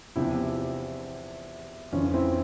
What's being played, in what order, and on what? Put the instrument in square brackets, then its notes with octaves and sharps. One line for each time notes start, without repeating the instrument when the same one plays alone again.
[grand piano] E2 C3 F3 E4 G4
F2 E3 C#4 F4
C#4
C4 E4